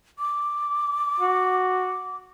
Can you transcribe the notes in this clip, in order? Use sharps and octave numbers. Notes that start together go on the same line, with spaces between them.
D6
F#4